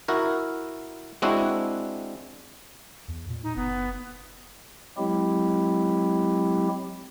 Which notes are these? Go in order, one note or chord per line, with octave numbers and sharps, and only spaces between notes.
E4 F#4 A#4
G#3 C4 D4 E4 F#4
E2
A#2
D#4
F#1 B3
F#3 G#3 C4 E4 G4